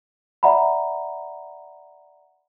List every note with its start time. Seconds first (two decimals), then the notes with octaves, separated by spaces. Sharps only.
0.43 D5 E5 F#5 A#5 B5